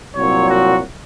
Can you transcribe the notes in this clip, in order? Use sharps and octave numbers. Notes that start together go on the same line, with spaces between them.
C2 A#2 F#3 C4 C#5
F#4